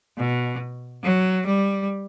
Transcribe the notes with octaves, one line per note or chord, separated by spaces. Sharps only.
B2
F#3
G3